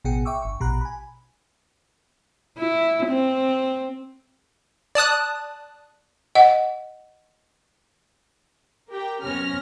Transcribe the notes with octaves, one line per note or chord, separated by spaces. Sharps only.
A1 B2 B3 G#4 G5 C#7
E5 G5 C#6 D6 E6
G1 C#6
A#1 B2 G4 A#5 B5 F#6
G#5 B5
E4
C4
D5 A5 D#6 F#6
D#5 F#5
G4 A#4 G5
F#2 C3 B3 C#4 F6 A#6